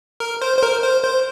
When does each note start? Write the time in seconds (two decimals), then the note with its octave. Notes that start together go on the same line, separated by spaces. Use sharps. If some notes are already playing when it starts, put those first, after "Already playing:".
0.20 A#4
0.42 C5
0.58 C5
0.63 A#4
0.83 C5
1.04 C5